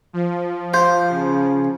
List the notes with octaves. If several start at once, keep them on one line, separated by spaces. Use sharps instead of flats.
F3
G4 C5 F5 G6
C#3